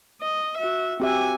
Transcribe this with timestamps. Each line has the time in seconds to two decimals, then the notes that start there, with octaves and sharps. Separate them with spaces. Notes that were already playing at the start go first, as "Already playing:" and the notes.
0.21 D#5
0.57 F#4 E5
1.00 C4 F#4 G4 E5 G#5